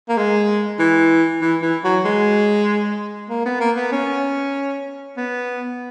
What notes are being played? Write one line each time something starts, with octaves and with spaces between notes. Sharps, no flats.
A#3
G#3
E3
E3
E3
F#3
G#3
A#3
B3
A#3
B3
C#4
B3